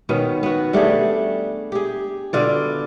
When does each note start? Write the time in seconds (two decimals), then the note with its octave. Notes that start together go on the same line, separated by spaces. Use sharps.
0.09 B2 D#3 B3 C#4
0.43 B3 F#4
0.73 G3 A3 D4 G#4
1.72 G4 G#4
2.33 B2 D3 F4 D5